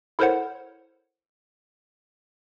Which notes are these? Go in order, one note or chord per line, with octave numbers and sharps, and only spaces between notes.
E4 A4 A#4 C5 C#5 F#5